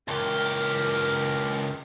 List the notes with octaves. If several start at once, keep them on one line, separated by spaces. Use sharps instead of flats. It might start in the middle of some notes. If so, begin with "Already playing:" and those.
C#2 G4 A#4